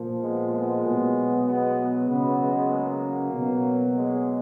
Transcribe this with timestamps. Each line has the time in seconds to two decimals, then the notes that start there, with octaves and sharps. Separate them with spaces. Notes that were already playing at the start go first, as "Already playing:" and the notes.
Already playing: A#2 F3
0.22 G#3 B3
0.53 G#3 B3
0.84 B2 F#3
1.46 G#3 B3
2.09 C#3 F#3 G#3 B3
2.39 G#3 B3
2.71 A#3
3.33 B2 F#3
3.95 G#3